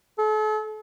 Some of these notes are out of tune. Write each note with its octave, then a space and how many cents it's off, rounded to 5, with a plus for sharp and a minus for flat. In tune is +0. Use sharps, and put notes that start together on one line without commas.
A4 -40